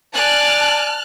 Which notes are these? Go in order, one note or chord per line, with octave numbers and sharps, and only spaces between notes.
D5 G#5 A5 F6 F#6